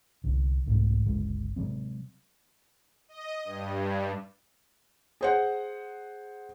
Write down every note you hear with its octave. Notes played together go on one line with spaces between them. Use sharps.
C2 D3
C2 G#2 B2 A3
G1 C#2 G#3
C3 F#3 G#3 C4
D#5
G2
G#4 C5 F#5